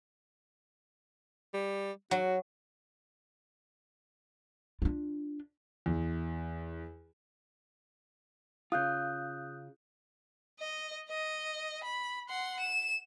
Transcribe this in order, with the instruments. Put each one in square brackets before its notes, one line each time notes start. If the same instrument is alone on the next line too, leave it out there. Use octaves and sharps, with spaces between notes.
[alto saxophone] G3
[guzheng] F#3 [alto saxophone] F#4
[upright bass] D4 F4
[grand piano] E2
[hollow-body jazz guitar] C#3 F4 [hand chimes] D#6 F#6 G6
[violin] D#5
D#5
B5
F#5 C6
E7